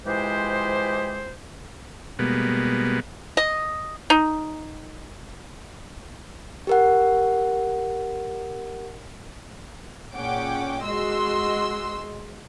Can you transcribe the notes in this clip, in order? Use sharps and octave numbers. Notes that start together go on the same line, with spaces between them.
E3 F3 G#3 G4 G#4 C5
B2 G3 G#3 A#3 B3
D#5
D#4
G4 A#4 F#5
A#2 C#4 G#4 F#5 G5 D6
G#3 F#4 D#5 C6 E6